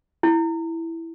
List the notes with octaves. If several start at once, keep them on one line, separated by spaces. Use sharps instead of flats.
E4